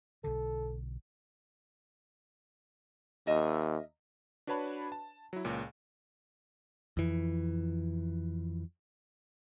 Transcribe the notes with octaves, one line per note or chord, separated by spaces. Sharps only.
B1 D3 A4
D#2 A#4 D#5 E5
D4 F#4 B4 C#5 A5 B5
A5
F#3 E4
C#2 A#2 C#4
F2 E3